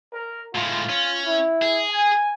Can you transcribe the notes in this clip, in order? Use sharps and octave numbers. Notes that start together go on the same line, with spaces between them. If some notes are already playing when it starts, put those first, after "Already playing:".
A#4
A2 G#3 F4
C#4
E4
G#4
G#5